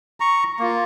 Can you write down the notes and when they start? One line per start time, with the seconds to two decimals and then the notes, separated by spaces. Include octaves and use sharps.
0.20 A#5 C#6
0.60 A#3 F4